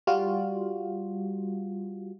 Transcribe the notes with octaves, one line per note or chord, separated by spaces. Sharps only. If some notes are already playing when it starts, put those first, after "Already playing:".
G3 F4 F#4